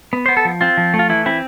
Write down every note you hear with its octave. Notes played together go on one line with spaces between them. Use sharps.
B3
B3 C5
A4
F3
C4 F4
F3
A3
F4
E3 E4
C4 E4